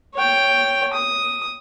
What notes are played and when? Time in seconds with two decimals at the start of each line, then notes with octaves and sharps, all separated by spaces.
0.15 C#5 G5
0.93 D#6